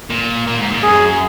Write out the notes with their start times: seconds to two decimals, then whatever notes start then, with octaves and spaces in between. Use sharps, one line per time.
0.10 A#2
0.47 A#2
0.58 G#2
0.71 A#2
0.83 F#2 G#4